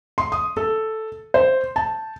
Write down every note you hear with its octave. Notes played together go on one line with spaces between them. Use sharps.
C6
D#6
A4
C5
A5